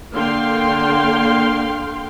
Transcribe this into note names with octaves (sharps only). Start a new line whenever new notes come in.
D3 A#3 F5 G5 C6